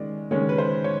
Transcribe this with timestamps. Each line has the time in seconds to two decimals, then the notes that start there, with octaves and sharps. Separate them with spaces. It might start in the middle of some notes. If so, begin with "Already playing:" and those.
Already playing: D#3 G#3 C#4 D5
0.31 D#3 G#3 C#4 C#5
0.49 B4
0.58 C5
0.84 C#5